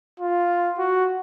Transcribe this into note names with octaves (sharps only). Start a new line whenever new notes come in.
F4
F#4